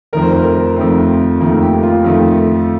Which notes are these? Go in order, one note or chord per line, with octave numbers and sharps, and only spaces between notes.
F2 D#3 A3 A#4
C5
A#4
A#4
F2 D#3 A3 C4
F2 D#3 A3 A#3
G4
F4
F2 D#3 A3